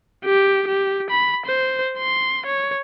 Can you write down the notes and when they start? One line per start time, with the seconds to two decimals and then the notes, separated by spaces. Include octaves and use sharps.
0.25 G4
0.67 G4
1.10 B5
1.46 C5
1.99 C6
2.46 C#5